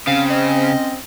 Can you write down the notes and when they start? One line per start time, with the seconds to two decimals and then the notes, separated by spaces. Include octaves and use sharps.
0.07 C#3 C4 C#4 F5
0.30 D#5